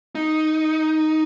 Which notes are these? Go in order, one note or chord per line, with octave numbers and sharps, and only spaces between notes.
D#4